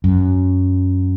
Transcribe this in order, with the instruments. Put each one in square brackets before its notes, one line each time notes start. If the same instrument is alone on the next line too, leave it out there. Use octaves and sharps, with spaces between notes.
[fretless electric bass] F#2